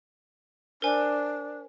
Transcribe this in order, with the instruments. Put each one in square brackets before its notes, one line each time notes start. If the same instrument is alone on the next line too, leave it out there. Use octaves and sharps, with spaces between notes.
[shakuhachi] D4 [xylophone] A#4 C5 G#5